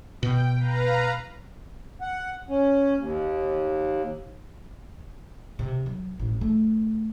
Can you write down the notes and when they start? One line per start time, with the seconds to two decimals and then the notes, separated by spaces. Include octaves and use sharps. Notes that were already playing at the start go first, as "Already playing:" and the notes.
0.23 B2 G5
0.56 B4 F5 A#5
2.01 F#5
2.49 C#4
2.97 D#2
5.59 C3
5.86 F#3
6.20 A1
6.41 A3